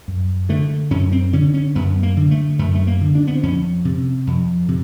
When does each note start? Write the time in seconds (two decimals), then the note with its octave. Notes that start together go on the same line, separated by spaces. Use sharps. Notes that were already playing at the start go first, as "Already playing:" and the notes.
0.08 F#2
0.49 D3 A3
0.91 F#2 C#4
1.12 C4
1.33 D3 C#4
1.54 C#4
1.75 F#2 B3
2.03 A#3
2.17 D3
2.31 A3
2.59 F#2 A3
2.75 A3
2.87 A#3
3.01 D3
3.15 D4
3.27 B3
3.35 C4
3.43 F2 C#4
3.85 C3
4.27 F2
4.68 C3